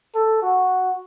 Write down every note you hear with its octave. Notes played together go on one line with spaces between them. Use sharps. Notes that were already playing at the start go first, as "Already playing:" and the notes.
A4
F#4